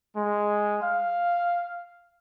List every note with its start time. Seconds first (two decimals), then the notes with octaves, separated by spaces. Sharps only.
0.17 G#3
0.83 F5